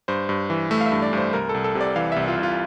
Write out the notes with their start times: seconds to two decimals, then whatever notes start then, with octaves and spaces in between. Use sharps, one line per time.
0.08 G2 C5
0.29 G2
0.50 E3
0.71 A3 E5
0.81 F5
0.86 E5
0.92 G2
1.02 D5
1.13 G2 C5
1.33 C2 A#4
1.49 A4
1.54 C2
1.64 A4
1.75 C3
1.81 D5
1.96 E3 F5
2.12 C2 E5
2.28 F4
2.37 C2
2.43 F4